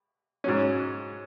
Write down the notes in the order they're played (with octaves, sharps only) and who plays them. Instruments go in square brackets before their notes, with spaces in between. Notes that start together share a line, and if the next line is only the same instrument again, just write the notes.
[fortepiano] G#2 F#3 C#4